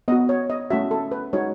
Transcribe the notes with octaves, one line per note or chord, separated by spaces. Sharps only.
B3 F#4 D#5
C#5
D#5
A3 C#4 F#4 E5
A4
B4
G#3 D#4 F#4 C#5